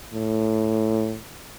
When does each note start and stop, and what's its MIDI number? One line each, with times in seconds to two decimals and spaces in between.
0.13 1.18 45